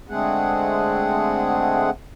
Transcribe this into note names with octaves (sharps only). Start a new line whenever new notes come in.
D3 G#3 A3 C4 G#4 F#5